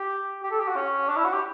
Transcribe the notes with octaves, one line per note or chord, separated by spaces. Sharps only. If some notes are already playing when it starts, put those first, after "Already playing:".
Already playing: G4
G4
A4
G4
F#4
C#4
D4
E4
F#4
G4